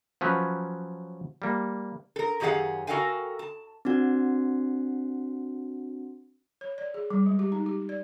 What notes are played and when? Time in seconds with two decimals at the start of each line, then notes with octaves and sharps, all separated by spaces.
0.21 F3 F#3 C#4 B4
1.42 G3 A#3
2.16 A4 A#4
2.40 F#2 D#3 G4 G#4 F5 F#5
2.87 F#4 A4 A#4 F5 G5 G#5
3.39 A5
3.85 C4 D4 F#4 F#5
6.61 C#5
6.78 D5
6.94 G#4
7.10 G3
7.26 G#3
7.39 G4
7.52 D#4
7.66 G4
7.89 D5